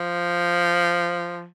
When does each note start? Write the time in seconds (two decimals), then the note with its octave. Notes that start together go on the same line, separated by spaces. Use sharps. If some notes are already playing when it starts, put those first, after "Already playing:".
Already playing: F3